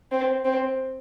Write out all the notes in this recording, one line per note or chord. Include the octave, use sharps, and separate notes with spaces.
C4
C4